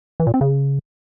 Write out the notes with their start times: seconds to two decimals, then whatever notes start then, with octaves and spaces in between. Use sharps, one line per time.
0.20 E3
0.27 A#2
0.34 C4
0.41 C#3